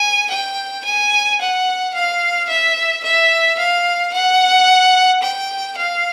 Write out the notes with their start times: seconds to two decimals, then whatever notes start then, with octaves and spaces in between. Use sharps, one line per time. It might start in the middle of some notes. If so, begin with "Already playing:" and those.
Already playing: G#5
0.31 G5
0.85 G#5
1.40 F#5
1.94 F5
2.49 E5
3.04 E5
3.58 F5
4.13 F#5
5.22 G5
5.77 F5